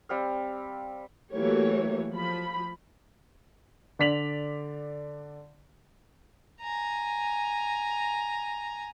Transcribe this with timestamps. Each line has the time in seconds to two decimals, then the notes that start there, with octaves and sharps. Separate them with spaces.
0.09 G3 C4 F5
1.34 E3 F#3 A3 A#3 G4 C#5
2.12 F3 B5
3.99 D3 D5 B6 F7 F#7
6.61 G#5 A#5